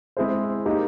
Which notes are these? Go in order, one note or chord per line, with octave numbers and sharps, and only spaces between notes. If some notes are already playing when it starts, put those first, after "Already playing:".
G#3 C4 E4 G#4 C5
A#3 D#4 G4 A#4